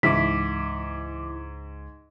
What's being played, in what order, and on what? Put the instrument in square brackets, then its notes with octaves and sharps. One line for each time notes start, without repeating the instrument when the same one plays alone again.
[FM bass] C#2 [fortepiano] G#2 [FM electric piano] E3 E4 D6 [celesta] B6